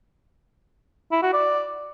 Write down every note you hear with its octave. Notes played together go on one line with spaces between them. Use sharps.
E4
F#4
D5